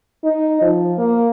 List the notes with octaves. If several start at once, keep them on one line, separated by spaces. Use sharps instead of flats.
D#4
F3
A#3